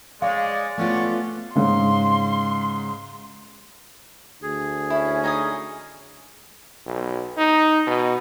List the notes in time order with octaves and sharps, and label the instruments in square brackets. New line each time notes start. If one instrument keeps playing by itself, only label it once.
[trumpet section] G#3 [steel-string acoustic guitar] C#5 [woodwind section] D5 [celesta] F5
[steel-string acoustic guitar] A3 B3 F4 [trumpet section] C#4 F#5
[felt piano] G#2 C#3 [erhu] C6
[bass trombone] D2 [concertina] G#4
[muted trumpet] C#4 [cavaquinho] E4
[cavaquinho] D#4 G#5 D#6
[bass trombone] B1
D#4
B2